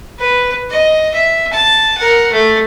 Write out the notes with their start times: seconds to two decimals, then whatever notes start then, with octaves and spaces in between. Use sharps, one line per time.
0.19 B4
0.70 D#5
1.14 E5
1.53 A5
1.98 A#4 F#5
2.32 A3